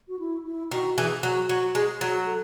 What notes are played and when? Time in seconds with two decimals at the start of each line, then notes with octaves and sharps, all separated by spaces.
0.08 F#4
0.19 E4
0.45 E4
0.71 D#3 F#4
0.96 E3 G#4
1.22 F#3 F#4
1.48 F#3 F#4
1.75 G#3 G#4
2.00 F#3 F#4
2.26 A4